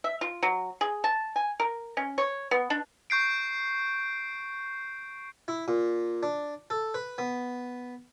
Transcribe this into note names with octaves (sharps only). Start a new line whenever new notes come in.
E5
F4
F#3
G#4
A5
G#5
A#4
C#4
C#5
B3
D4
C#6 G6 C7 D7
E4
A#2
D4
A4
B4
B3